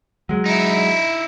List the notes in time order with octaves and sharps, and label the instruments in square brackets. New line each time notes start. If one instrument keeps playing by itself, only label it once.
[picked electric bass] F#3 G#3
[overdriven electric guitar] D#4 E4